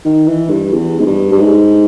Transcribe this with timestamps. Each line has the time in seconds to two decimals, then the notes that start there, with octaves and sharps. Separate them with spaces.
0.05 D#3
0.27 E3
0.50 G2
0.73 E2
0.99 G#2
1.06 G2
1.32 G2
1.40 G#2